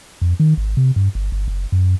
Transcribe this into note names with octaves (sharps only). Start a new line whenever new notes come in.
F2
D#3
G#1
C3
G2
G1
G1
F#1
F#2